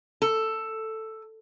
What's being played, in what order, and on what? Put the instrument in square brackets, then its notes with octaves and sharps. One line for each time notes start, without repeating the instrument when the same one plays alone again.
[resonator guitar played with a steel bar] A4